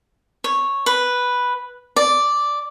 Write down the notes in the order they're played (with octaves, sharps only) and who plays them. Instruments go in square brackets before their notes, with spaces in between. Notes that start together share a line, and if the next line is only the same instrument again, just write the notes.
[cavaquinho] C#5
B4
D5